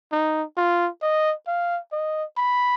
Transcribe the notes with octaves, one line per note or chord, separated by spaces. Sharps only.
D#4
F4
D#5
F5
D#5
B5